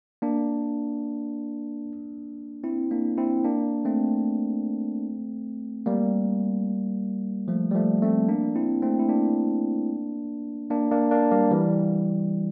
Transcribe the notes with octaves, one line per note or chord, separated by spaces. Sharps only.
A#3 D4
C4 E4
A#3 D4
C4 E4
A#3 D4
A3 C4
G3 A#3
F3 A3
G3
F3 A3
A3 C4
A#3 D4
C4 E4
A3 C4
E4
A#3 D4
A#3 D4
A#3 D4
A#3 D4
G3 A#3
E3 G3